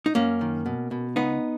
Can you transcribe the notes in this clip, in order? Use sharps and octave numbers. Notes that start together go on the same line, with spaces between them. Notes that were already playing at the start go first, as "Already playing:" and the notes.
D#4
F#2 A#3 C#4
D#3
B2
B2
C#2 B3 D#4